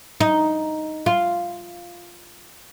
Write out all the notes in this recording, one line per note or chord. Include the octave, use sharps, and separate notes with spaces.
D#4
F4